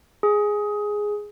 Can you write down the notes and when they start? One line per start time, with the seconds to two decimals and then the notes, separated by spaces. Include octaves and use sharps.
0.23 G#4